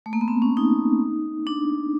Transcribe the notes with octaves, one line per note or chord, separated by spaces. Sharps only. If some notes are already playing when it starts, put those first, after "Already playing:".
A3
A#3
B3
C4
C#4
D#4
D4